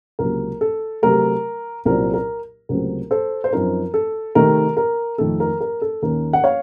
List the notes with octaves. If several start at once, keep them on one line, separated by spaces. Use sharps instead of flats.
C#2 C3 F#3 A#3 A#4
A4
C3 F#3 A3 A#4
C2 A#2 F#3 C4 A#4
A#4
C#2 C3 F#3 A3 C4 A#4
A4 C5
C5
F#2 F3 C4 D#4 A#4
A4
C3 D#3 A3 D#4 A#4
A#4
F2 D#3 A3 A4
A#4
A#4
A4
D#2 D#3 A#3 C#4 A#4
F#5
C#5 F5